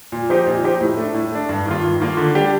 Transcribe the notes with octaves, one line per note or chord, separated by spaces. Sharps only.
A#2
F3 C4 D#4 G4
A#2
F3 C4 D#4 G4
A2
A3 D4
A2
A3 D4
G2
D#3 A#3 F4
G2
D#3 A#3 F4
D3
G3 D4 G4